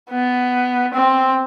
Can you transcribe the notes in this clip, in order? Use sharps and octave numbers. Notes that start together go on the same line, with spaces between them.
B3
C4